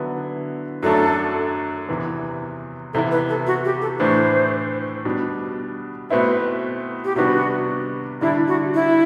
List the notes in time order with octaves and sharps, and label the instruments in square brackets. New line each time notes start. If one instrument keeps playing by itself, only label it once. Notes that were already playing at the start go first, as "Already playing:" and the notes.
Already playing: [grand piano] D3 F#3 B3 E4
[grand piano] F#2 F#3 A3 D4 [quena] A4
[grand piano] E2 C3 E3
[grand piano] C3 E3 B3 E4 [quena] A4
[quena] B4
A4
F#4
G4
A4
[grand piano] A2 E3 A3 D4 [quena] C5
[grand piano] B2 G3 D4
[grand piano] B2 A3 C4 E4 [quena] B4
[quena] G4
[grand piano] C3 G3 B3 D4 [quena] F#4
[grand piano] D3 G3 D4 [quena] E4
[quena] F#4
E4